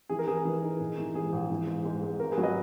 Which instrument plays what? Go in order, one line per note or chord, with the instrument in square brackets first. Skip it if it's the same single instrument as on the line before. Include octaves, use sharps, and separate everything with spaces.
[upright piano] E3 G#4
A#4
E3 G#4 B4
A#4
E3
D#4
A#1
E3
G#2 G#4
A#1
E3
G#2
G#2
G#2
G#1 A#4
G#4 B4
F#3
B4 D#5